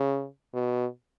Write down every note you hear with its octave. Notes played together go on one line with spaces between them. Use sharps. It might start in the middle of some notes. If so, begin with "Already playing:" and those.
Already playing: C#3
B2